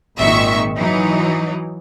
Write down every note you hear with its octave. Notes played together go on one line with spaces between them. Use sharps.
G#1 A#2 D#3 E5 C#6
E3 F#3 D#4